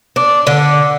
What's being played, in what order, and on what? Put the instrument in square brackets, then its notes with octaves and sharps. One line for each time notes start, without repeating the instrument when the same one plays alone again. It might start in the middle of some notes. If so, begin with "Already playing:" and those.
[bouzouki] D4
D3